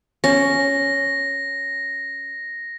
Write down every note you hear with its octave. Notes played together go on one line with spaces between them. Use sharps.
C#4 A#6